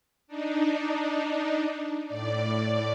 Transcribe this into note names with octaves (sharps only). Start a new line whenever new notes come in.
D4 D#4
A2 D5